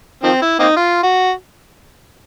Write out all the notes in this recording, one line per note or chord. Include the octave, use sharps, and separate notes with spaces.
D#3 F3 C4
E4
A#3 C4 D#4
F4
F#4